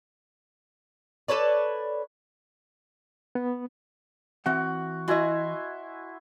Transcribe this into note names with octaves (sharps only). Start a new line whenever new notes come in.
A4 B4 C#5 D5
B3
E3 C4 F#4 F#5
E4 F#4 D#5 G#5 C6